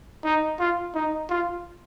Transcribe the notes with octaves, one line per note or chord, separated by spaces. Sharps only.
D#4
F4
D#4
F4